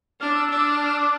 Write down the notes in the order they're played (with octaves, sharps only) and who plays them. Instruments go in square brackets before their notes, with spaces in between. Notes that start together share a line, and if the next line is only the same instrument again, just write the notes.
[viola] D4 [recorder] F6
[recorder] E6
[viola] D4 [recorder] E6
[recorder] F6
D6